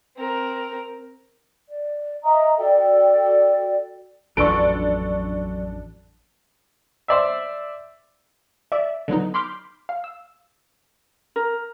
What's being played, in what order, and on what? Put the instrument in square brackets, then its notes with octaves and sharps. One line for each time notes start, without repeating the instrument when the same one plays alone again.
[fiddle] C4 A#4
[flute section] D5
D#5 E5 A#5 D#6
F#4 A4 D5 G5
[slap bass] A1 F2 [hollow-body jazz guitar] F#3 B4 [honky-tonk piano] D4 A4 [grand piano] C#6 D7
[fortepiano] C5 D5 E5
[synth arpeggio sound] D5 E5
D3 F#3 B3 D#4
B5 C6 D6 F6 G6 B6
F5
E6
[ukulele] A#4